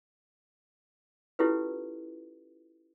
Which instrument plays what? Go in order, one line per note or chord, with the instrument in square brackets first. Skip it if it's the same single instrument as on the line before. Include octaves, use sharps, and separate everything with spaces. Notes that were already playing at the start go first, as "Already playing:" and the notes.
[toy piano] C#4 E4 F4 G4 A4 B4